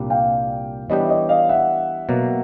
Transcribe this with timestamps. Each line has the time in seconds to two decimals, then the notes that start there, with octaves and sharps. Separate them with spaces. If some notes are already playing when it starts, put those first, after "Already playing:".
Already playing: C2 A#2 G3 A#3 D4
0.10 F5 G5
0.89 E3 G3 B3 D4 G4 C#5 D#5
1.03 E5
1.09 C#5 D#5
1.29 D#5 F5
1.49 E5 F#5
2.09 B2 F#3 A#3